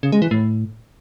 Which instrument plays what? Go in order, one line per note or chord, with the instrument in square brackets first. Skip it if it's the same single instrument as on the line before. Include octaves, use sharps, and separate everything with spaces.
[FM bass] C#3
G#3
E3
A2